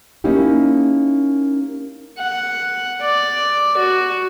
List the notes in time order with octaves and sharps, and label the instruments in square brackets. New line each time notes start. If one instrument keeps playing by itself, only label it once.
[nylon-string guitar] A#3 C#4 D#4 E4 G4
[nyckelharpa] F#5
D5
F#4